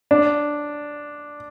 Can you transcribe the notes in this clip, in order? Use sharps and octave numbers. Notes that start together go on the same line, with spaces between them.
D4